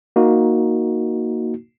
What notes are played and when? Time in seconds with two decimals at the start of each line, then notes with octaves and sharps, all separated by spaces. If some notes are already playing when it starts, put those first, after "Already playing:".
0.16 A#3 D#4 F#4